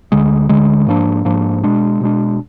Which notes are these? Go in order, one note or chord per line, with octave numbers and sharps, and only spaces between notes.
D2 D3 G#3
D2 D3 G#3
G#2 F3 A#3 D4
G#2 F3 A#3 D4
B2 G#3 D4
B2 G#3 D4